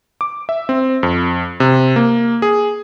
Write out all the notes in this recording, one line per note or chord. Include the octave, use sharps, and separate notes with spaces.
D6
E5
C4
F2
C3
A#3
G#4